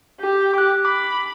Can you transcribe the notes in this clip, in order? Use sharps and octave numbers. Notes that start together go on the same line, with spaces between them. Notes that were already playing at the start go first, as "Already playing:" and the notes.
G4
D6 F#6
B5 D6